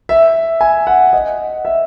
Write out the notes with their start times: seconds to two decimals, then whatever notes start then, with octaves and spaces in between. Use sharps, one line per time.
0.09 E5
0.61 G#5
0.87 F#5
1.13 D#5
1.65 E5